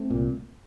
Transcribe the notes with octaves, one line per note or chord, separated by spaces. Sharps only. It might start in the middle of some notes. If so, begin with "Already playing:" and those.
Already playing: A3 C4
C2 A#2